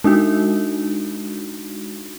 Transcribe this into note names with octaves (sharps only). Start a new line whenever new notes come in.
G#3 D4 D#4 F#4